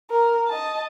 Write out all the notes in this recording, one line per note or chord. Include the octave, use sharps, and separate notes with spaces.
A#4
D#5 A5